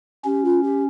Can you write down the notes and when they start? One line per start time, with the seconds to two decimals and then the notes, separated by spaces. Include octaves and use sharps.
0.25 C#4 G4
0.44 F4
0.63 G4